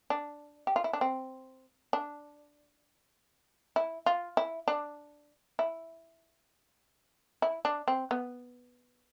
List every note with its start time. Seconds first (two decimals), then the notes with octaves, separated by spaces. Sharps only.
0.10 D4
0.67 G4
0.76 F4
0.84 E4
0.93 D4
1.01 C4
1.93 D4
3.76 E4
4.06 F4
4.37 E4
4.68 D4
5.59 E4
7.42 E4
7.65 D4
7.88 C4
8.11 B3